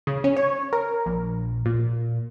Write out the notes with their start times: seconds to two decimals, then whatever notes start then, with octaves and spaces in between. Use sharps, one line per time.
0.07 C#3
0.24 C#4
0.37 C#5
0.73 A#4
1.06 A#1
1.66 A#2